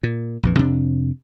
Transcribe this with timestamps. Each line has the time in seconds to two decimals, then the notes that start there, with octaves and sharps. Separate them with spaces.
0.03 A#2
0.43 A#1 F2 E3
0.59 F2 C3 D4